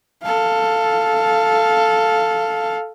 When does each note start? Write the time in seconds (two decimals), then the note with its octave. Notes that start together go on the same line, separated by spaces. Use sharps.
0.23 A4 F5